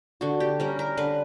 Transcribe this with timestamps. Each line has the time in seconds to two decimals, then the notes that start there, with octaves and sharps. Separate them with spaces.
0.21 D3 F#4
0.40 G4
0.60 G3 C#4 A#4
0.79 A#4
0.97 D3 B4